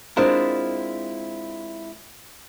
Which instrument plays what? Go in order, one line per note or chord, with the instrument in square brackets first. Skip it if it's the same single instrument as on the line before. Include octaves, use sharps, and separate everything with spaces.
[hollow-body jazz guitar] G#3 C4 D4 E4 F4 A#4